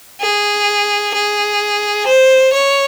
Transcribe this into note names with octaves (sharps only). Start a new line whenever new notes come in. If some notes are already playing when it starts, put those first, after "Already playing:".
G#4
G#4
C5
C#5